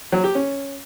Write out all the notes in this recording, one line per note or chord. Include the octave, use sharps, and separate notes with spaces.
F#3
G4
C#4